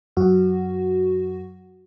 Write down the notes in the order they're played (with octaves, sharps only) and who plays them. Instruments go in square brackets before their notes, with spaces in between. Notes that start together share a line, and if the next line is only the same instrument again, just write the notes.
[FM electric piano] F#2 F#4